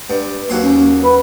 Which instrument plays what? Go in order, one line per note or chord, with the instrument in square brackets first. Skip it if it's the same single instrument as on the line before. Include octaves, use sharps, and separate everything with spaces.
[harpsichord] G2
[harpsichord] D#2 F#3 C6 [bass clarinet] A#3
[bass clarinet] C#4
B4